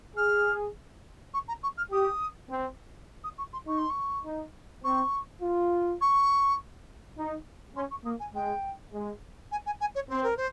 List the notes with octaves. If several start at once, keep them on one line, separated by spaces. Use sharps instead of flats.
G#4 F6
C#6
A#5
C#6
F6
G4 D#6
C4
D#6
C#6
C6
D#4 C#6
C6
C#6
D#4
C4 C#6
F4
C#6
D#4
C#4 C6
C#6
A#3 D#6
G#5
G#3 G5
G#3
G#5
G#5
G#5
C#5
C4 C5
A#4
C5